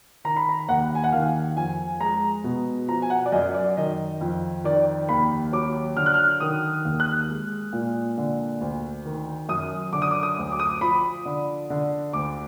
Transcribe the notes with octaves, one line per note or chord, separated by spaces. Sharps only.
D#3 A#5
B5
A#5
D#2 F#5
G#5
F#5
D#3 F5
F2 G#5
G#3 A#5
B2
F3 A#5
G#5
F#5
D5
F#2 D#5
D5
D#3 D#5
F2
D#3 D5
D#2 B5
F#3 D6
D3 F6
F#6
F6
D#3 D#6
D#2
F#6
G#3
A#2
D3
D2
D#3
F#2 D#6
D3 D6
D#6
D6
D#6
D2
D6
D#6
D6
F3 B5
D3
D3
D2 D6